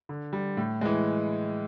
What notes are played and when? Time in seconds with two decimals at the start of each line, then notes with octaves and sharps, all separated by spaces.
0.09 D3
0.33 G3
0.57 A2
0.81 E3 G#3